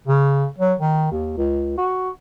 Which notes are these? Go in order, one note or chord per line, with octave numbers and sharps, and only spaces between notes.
C#3
F#3
D#3
D#2
C#2
F#4